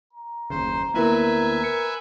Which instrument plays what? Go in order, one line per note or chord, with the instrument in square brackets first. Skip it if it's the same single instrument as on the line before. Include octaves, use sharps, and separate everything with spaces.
[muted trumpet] A#5
[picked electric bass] F#1 D#2 C#3 [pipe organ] C5
[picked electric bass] D2 A#3 [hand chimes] B3 E4 A#4 [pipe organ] B4 E5 G#5
[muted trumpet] A#4 [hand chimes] C#7